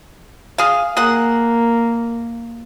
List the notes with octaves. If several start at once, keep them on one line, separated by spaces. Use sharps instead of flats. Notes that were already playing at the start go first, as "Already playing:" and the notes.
G#4 F5
A#3 G#4 F#5